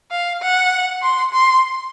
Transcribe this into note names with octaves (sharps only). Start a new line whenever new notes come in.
F5
F#5
C6
C6